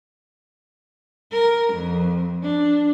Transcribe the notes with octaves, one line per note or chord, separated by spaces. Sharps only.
A#4
F2
D4